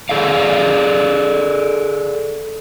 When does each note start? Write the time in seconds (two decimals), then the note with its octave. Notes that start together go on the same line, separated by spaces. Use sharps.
0.09 G#4 A4 D5 F5